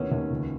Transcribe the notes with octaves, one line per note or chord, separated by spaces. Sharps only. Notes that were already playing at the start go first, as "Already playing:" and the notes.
Already playing: D#2 A3 B3 C#4 E4
D#2
C#2